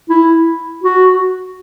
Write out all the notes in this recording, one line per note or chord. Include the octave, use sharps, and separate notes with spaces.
E4
F#4